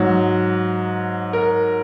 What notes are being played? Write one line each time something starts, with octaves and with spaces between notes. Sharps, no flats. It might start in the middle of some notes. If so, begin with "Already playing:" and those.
Already playing: G#2 F#3
A#4